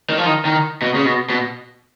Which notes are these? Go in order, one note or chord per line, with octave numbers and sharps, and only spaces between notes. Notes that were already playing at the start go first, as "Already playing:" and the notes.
D#3
F3
D#3
D#3
B2
C#3
B2
B2